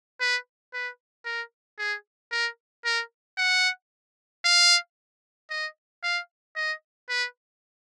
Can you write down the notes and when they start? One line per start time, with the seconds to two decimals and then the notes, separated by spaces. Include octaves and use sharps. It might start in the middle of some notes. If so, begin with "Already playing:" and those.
0.20 B4
0.73 B4
1.25 A#4
1.79 G#4
2.32 A#4
2.85 A#4
3.37 F#5
4.45 F5
5.50 D#5
6.04 F5
6.56 D#5
7.09 B4